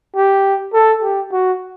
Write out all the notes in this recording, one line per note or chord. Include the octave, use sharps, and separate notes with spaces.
G4
A4
G4
F#4